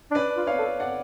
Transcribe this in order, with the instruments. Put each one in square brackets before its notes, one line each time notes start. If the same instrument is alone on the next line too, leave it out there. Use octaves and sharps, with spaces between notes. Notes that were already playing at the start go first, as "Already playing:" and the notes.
[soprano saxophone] D4
[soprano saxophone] C#4 [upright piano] B4 D5
[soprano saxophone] F4
[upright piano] C#5 F5
[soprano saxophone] A4
[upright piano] D5 F#5